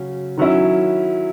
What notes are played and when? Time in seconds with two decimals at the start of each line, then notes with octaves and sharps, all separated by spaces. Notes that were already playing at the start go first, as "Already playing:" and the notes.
Already playing: C#3 F#3 C#4
0.37 D#3 F#3 C#4 E4